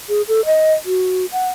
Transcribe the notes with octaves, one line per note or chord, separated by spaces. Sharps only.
G#4
A4
D#5
F#4
F#5